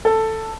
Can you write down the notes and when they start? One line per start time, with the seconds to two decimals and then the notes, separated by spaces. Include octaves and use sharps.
0.05 A4